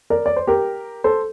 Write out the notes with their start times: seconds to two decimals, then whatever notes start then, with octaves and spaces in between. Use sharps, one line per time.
0.10 A#4 D5
0.26 D5
0.36 C5
0.47 G4 A#4
1.04 A4 C5